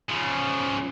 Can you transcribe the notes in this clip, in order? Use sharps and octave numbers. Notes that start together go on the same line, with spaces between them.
C#3 F3